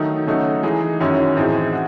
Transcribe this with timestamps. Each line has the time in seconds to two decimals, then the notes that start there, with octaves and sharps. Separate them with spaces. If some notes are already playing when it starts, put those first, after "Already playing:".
Already playing: D#3 F#3 A3 D#4
0.26 C#3 F#3 A3 D#4 F#4
0.63 E3 G#3 D#4 G#4
1.00 F#2 D#3 F#3 C#4 E4
1.37 A2 E3 C4 D#4 G#4
1.73 F#4